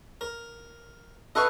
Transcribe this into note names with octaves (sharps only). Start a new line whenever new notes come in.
A#4
A4 B4 D#5 F5 C#6